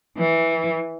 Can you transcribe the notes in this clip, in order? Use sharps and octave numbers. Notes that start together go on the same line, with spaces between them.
E3